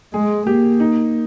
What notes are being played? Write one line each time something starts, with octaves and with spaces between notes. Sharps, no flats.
G#3 G#4
A#3 G4
D#4